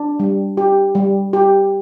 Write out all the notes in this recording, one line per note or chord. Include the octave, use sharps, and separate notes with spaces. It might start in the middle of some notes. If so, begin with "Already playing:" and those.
Already playing: D4
G3
G4
G3
G4